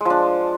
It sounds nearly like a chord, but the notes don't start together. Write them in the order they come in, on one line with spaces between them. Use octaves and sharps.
G#3 F3 D4